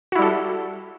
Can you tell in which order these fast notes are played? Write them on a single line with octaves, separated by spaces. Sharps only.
F#4 E4 G3 A4